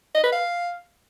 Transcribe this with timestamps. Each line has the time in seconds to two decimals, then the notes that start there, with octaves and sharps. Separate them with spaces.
0.15 D#5
0.24 B4
0.32 F5